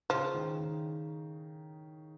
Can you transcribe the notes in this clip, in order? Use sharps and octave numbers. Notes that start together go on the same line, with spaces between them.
C#3 F3
D#3
D#3